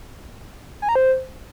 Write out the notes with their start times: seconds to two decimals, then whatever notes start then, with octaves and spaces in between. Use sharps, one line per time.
0.82 G#5
0.89 A#5
0.95 C5